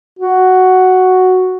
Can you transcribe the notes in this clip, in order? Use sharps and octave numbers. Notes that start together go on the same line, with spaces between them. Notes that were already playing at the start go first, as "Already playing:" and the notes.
F#4